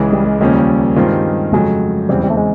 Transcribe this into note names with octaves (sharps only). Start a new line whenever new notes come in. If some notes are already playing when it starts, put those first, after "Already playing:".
Already playing: C#2 C#3 E3 G#3
G3
G#3
D#2 C#3 F3 G#3 A#3 C#4
G3
G2 D#3 G#3 C4 F4
F2 C#3 F#3 G#3 A3
E2 C#3 E3 G3 G#3 C4
G3
A3
G#3